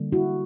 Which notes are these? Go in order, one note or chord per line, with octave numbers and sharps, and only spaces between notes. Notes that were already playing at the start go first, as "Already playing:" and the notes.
Already playing: D3 G3 A#3
E4 F#4